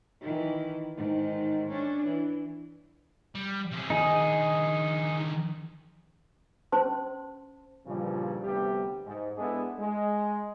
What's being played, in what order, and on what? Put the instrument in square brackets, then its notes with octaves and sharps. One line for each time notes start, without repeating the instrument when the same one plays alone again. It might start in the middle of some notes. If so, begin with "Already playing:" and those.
[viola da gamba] D#3 E3
G#2 D#3
C#4 D4
E3
[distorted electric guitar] G3
C3 G#4
[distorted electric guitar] D3 D#3 [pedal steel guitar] D#4 G#4
[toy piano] C#4 C5 A5 C6
[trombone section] G2 A#2 C#3 E3 F3 G3
D2 C3 G3 B3 G4
G#2
G#3 B3 D4 E4 G#4 A4
G#3